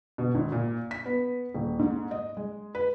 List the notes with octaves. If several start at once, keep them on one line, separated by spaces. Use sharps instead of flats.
B2
G#1
A#2
B6
B3
D#1
G#2
D#5
G#3
B4